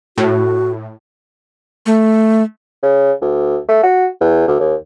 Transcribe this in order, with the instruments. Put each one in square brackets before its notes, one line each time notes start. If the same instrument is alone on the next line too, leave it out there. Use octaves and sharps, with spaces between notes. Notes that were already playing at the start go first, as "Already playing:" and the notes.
[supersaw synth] A2 [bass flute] F#4
[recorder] A3
[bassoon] C#3
D2
A3
F#4
E2
D2
D#2